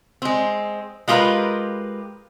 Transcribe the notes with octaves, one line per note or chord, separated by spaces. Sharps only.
G#3 C4
G#3 F4 G4 G#4 A#4 B4